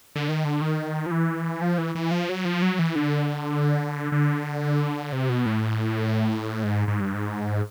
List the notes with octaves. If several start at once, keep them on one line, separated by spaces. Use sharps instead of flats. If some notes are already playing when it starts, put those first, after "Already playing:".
D3
D#3
D3
D#3
F3
E3
F3
E3
E3
F3
F#3
F3
F#3
E3
D3
D3
C3
B2
A2
G#2
G#2
G2
G#2